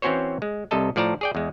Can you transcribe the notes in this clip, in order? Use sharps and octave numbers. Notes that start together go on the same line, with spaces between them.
E3 C4 C#4 F#4 C5 C#5
G#3
C2 C3 A4 D#5 A5
A2 F3 D5 A5 A#5
G#4 D5 G5
E2 G#3